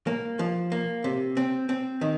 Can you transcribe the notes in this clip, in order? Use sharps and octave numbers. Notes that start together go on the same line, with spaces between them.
A#3
F3
A#3
C3
C4
C4
D#3